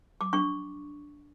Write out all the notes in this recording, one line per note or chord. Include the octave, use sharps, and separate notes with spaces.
D6
D4 C#6